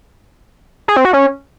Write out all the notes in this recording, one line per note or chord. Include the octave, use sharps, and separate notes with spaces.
G#4
C4
F#4
C#4